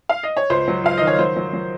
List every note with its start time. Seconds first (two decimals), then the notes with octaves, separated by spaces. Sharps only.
0.09 F5
0.23 D#5
0.37 C#5
0.50 C#2 C5
0.68 F#3
0.84 C#2 F5
0.98 D#3 D#5
1.07 C#5
1.19 F#3 C5
1.36 F#3
1.53 F#3